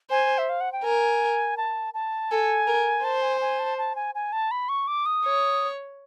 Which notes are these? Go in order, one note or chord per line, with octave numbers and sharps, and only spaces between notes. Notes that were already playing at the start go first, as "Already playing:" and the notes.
C5 G#5
E5
F5
F#5
G5
A#4 G#5
A5
A5
A4 G#5
A#4
C5 A5
G#5
G#5
A5
A5
G#5
G#5
A5
B5
C#6
D6
D#6
C#5